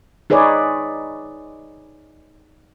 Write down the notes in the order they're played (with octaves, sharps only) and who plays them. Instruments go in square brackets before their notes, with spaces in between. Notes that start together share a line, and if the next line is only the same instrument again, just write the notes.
[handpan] D#4 G#4 B4 C#5 D5